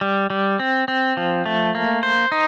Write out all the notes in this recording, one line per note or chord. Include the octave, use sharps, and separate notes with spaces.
G3
G3
C4
C4
F3
A3
A#3
C5
D#4